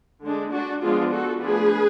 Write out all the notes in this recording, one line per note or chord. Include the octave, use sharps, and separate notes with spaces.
D3 G#3 D4
D4 F#4
F3 G#3 B3 D4 F4 G#4
F#4 A4
F3 A3 D4 G#4 B4